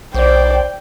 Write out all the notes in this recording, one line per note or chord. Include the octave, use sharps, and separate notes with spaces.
B1 C5 D5 G5